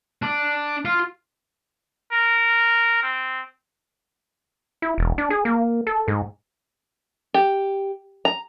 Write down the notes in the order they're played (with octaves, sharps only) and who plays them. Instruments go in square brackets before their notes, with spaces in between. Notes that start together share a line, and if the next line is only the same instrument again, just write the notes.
[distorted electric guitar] D4
F4
[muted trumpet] A#4
C4
[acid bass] E4
E1
D4
G#4
A#3
A4
G#2
[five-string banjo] G4
A#5